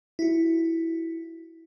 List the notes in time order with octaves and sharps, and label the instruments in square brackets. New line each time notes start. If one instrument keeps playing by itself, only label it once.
[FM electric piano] E4 F#4